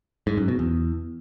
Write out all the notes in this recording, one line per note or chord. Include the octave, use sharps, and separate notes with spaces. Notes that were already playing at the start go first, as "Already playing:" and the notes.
G#2
F#2
B2
E2